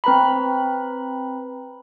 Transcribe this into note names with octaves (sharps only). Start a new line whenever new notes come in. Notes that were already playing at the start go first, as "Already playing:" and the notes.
C4 B4 A#5 B5